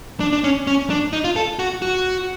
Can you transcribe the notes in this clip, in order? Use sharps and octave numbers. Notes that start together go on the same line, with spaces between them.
D4
D4
C#4
C#4
D4
D#4
F4
A4
F#4
F#4